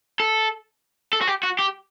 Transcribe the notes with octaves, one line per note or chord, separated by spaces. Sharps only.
A4
A4
F#4
G4
F#4
G4